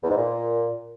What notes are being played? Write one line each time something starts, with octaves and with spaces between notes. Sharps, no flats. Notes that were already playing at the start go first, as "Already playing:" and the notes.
E2
G#2
A#2